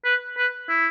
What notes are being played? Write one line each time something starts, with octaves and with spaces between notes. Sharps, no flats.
B4
B4
E4